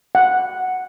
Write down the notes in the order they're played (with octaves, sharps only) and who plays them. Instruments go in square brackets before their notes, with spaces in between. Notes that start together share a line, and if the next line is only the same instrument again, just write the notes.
[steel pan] F#5